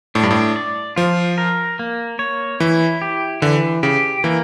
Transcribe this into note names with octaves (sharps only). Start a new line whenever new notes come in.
A2 D4
G2
A2
D5
F3 F4
A#4
A#3
C#5
E3 E4
G4
D3 E3
C#3 G4
E3 A#3